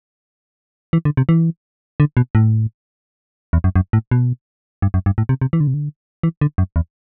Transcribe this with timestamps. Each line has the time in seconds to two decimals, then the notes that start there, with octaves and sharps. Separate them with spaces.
0.93 E3
1.05 D3
1.17 C3
1.29 E3
2.00 D3
2.17 B2
2.35 A2
3.53 E2
3.64 F#2
3.76 F#2
3.93 A2
4.11 B2
4.82 G2
4.94 F#2
5.06 G2
5.18 A2
5.29 C3
5.41 C3
5.53 E3
5.60 D3
5.67 C3
5.74 D3
6.23 E3
6.41 D3
6.58 F#2
6.76 E2